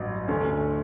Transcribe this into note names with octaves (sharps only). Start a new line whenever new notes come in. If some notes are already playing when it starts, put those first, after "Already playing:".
Already playing: A1 G2 F#3
D2 D3 A3 C#4